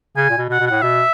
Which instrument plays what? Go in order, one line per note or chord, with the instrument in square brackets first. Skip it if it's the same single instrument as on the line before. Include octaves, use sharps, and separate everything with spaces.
[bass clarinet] C#3 [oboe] G#5
[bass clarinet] A#2
B2
B2
[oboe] F#5
[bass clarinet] B2
[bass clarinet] A2 [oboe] F#5
[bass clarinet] B2 [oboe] E5